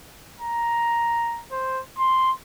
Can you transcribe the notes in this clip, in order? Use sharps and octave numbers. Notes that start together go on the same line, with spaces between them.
A#5
C5
C6